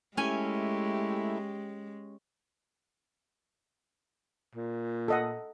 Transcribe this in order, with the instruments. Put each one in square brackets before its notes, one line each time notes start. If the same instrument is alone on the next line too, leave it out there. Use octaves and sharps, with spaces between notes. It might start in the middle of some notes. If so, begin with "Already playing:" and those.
[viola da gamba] G#3 [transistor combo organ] A3 E4 [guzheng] C#4 G#5 [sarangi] G4
[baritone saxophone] A#2
[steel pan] A4 D#5 F#5